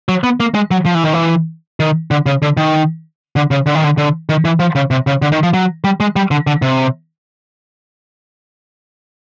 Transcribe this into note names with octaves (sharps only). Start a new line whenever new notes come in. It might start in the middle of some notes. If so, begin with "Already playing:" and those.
F#3
B3
A#3
G#3
F#3
F3
E3
D#3
E3
D#3
D3
C#3
D3
D#3
D3
C#3
D3
D#3
D3
D3
D#3
E3
F3
C#3
C3
C#3
D3
D#3
F3
F#3
G3
G#3
G3
D3
D3
C3